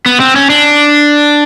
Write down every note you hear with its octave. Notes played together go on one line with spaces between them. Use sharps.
B3
C4
C#4
D4